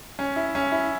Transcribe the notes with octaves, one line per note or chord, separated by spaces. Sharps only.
C#4
E4
C#4
E4